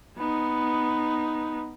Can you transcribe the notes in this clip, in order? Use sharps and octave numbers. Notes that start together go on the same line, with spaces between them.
B3 D#4